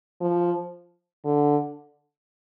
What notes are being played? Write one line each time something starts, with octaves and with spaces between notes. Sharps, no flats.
F3
D3